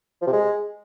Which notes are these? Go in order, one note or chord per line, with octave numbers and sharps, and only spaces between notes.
F3
C3
G#3